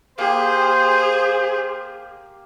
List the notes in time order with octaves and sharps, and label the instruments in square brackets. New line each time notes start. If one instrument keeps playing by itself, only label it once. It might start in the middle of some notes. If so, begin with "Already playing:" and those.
[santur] A#3 G4 [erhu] G#4 [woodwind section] C5